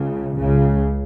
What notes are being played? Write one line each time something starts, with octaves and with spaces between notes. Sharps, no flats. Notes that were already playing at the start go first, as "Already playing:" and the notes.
Already playing: C#2 C#3
C#2 C#3